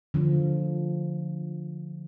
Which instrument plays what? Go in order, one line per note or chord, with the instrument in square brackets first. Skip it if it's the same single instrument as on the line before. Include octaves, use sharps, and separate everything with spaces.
[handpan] D3 F3